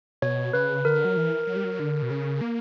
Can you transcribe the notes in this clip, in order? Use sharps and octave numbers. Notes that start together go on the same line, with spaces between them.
B2 C#5
C#3 B4
D3 A#4
F#3
E3
F#3
G3
F#3
D3
B2
C#3
A#3